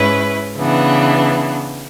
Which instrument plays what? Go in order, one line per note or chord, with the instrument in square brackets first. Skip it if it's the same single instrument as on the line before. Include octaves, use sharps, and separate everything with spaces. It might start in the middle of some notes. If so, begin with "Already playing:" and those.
Already playing: [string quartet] G#2 G#3 C#4 E4 B4
C#3 E3 B3 D4